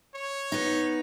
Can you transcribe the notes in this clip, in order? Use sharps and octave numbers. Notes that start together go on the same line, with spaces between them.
C#5
B3 D#4